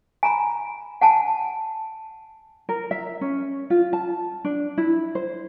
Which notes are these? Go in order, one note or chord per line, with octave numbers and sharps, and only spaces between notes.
G#5 A#5 B5
F#5 G#5 A5
A#4
E5
C#4
F4
A5
D4
E4
C5